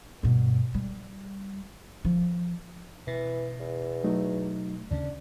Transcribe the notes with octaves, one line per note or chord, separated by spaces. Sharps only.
G2 B2
G3
F3
B2 E3
E2
F#3 A3 D#4
D#2 C#3 C#4 D4